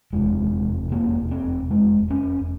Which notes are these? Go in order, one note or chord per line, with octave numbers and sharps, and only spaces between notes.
F1 E2 C3 G#3
A#3
C4
G#3
C#4